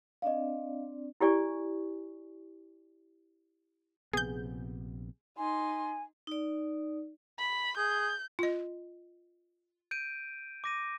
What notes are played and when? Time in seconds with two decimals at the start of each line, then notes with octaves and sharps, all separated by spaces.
0.22 C4 D4 D5 D#5 F5
1.21 E4 G4 D5 G#5 C#6
4.13 A#1 C3 B3 G#4 G6
5.38 D#4 G#5 C6
6.27 D#4 D5
7.39 B5
7.77 G#4 G6
8.39 F4 D#5
9.91 G6 D7 D#7
10.64 D6 A#6 D#7